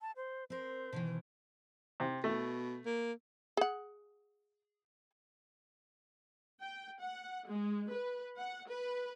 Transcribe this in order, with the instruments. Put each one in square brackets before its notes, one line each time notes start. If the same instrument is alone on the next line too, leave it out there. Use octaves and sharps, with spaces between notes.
[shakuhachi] A5
C5
[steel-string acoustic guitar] C4 A#4 [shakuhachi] C5
[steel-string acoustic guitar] B2 D#3 E3
[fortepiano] C3
[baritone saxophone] B2 [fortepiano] A3
[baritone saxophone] A#3
[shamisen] G#4 F#5
[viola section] G5
F#5
G#3
B4
F#5
B4